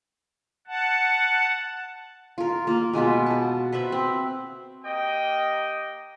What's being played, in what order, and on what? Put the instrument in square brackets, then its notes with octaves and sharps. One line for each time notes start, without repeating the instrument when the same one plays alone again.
[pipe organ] F#5 A5
[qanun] F4 A#4
A#3 F4
B2 G#3 F4 B4
F#4 A5
B4 C5 E5 B5
C4 B5
[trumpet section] A#3 G4 D#5 G5